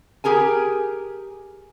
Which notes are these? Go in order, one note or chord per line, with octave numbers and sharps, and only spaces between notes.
G4 G#4 A#4 G#5